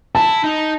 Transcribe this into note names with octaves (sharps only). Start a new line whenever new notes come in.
E4 A5
D#4